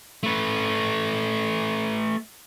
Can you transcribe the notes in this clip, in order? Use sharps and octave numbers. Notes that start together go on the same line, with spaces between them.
A3 B4